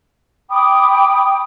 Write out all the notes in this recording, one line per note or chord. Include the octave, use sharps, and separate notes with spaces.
G5 B5 D6 D#6